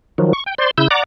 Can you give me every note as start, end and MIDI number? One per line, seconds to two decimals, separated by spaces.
0.18 0.33 51
0.18 0.33 53
0.18 0.33 54
0.33 0.44 85
0.46 0.55 79
0.58 0.71 72
0.58 0.71 74
0.58 0.71 84
0.78 0.88 49
0.78 0.88 64
0.78 0.88 88
0.78 0.88 91
0.91 1.03 74
0.91 1.03 78
0.91 1.03 82
0.91 1.03 86